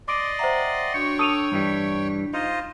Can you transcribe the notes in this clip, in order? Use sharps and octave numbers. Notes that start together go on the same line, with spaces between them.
D5 D#5 C6 D6 D7
C5 E5 F#5 G5 A#5
D4 F#4 C#5 G5 C#6 C#7
D4 A4 D#6 D#7 F7
G2 E3 G3
D#4 F4 C5 D#5